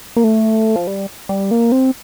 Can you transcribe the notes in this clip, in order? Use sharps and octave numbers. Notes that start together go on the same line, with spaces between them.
A#3
A3
F3
G3
G3
A#3
C4